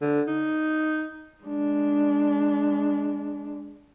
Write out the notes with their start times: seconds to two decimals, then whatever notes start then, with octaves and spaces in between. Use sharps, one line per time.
0.01 D3
0.27 D#4
1.44 G#3 D4